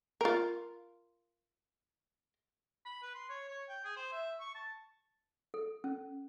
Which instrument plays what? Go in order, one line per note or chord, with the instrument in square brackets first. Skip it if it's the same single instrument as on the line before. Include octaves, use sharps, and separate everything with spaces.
[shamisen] F4 A#4
[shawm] B5
B4
C6
C#5
C#5
G5
G#4
C5
E5
C#6
A5
[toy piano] A4
C#4